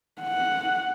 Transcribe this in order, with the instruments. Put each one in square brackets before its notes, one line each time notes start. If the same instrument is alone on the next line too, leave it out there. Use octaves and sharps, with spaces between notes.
[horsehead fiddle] F#5